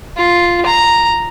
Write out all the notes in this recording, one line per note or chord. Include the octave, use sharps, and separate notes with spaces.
F4
A#5